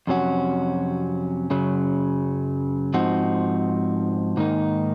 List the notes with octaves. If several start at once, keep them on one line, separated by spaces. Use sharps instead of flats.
F2 C3 F#3 C#4 F#4
F#2 C#3 F#3
G#2 F3 C4 D#4 F#4
G#2 D#3 A#3 D#4